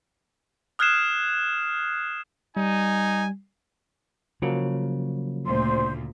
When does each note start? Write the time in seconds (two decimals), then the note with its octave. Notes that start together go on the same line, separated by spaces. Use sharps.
0.79 D#6 F6 F#6 G#6 C7 E7
2.57 G3 D#4 G#5
4.42 C#3 F3 F#3 A#3
5.46 D2 A#2 C5 C6